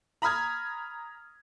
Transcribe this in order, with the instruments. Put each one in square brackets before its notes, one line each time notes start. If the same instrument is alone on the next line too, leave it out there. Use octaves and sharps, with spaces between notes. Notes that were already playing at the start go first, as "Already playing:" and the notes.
[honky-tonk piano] A#5 B5 D#6 F6 G#6